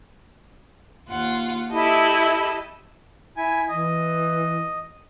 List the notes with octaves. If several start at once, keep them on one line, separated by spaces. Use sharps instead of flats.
D#2 F4 F#5
E4 G4 A4 D#5
E4 G#5
E3 D#5